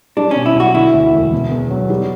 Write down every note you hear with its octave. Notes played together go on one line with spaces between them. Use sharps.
G3 D4
B2 C#4
E4
B1 F#4
D3 E4
D2
E1
B2
E2
F#3
G3